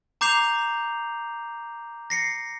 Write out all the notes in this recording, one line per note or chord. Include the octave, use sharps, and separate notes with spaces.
A#5 D6 G6 C7 F7
A#6 C7 C#7